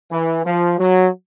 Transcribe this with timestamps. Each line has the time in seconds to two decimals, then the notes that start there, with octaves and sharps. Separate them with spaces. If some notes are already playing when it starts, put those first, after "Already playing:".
0.11 E3
0.44 F3
0.78 F#3